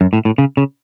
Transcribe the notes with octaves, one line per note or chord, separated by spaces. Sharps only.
F#2
A2
A2
C#3
C#3